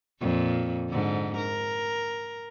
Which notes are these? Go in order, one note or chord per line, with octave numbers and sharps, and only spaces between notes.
F2 A#2
G#2 D3
A#4